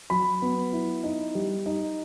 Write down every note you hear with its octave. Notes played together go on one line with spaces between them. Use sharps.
F#3 B5
B3
E4
D#4
G3
D#4